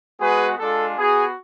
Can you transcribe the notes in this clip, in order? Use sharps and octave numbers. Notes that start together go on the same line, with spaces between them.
G#3 B3 F#4 G#4 B4
G#3 D4 F4 A4
B3 F#4 G#4